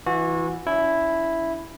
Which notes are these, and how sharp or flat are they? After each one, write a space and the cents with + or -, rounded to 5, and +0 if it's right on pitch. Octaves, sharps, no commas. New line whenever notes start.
E3 +0 F#4 -30
C#4 +45 E4 +0